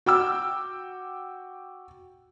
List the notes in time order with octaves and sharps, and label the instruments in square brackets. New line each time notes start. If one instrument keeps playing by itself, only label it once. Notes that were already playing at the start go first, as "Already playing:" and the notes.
[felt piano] F#4 G5 D6 E6